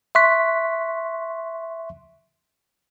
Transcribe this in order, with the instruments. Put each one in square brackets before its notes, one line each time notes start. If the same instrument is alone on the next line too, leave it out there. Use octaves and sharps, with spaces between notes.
[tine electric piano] E5 C6 C#6 F#6 B6